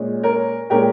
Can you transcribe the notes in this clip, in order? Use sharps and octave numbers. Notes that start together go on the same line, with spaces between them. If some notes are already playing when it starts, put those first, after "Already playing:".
Already playing: A#2 G#3 C#4
A#4 C#5
A#2 G#3 C#4 G4 A#4